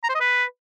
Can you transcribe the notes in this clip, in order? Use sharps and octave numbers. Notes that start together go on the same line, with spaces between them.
A#5
C5
D#5
B4